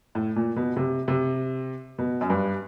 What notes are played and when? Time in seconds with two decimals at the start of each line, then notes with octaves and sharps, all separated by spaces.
0.15 A2
0.36 A#2
0.56 B2
0.76 C3
1.08 C3
1.98 B2
2.21 F#2
2.30 G2